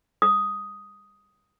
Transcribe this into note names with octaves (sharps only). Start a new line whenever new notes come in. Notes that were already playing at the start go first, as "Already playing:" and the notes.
D#6